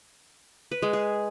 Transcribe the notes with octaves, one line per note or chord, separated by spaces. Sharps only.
B4
G#3
G#4